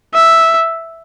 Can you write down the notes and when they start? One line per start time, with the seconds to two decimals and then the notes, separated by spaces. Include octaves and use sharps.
0.14 E5